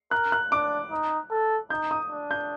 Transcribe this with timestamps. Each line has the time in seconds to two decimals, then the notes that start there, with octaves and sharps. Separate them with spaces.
0.11 A#4 F#6
0.32 F#6
0.52 D4 D6
0.91 D#4
1.31 A4
1.70 D#4 G6
1.91 D#6
2.10 D4
2.31 G6